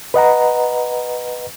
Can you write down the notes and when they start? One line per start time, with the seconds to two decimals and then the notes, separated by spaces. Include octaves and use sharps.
0.14 B4 D#5 F#5 A#5